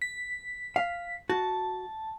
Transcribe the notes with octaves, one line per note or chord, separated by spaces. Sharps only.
B6
F5
F#4 A5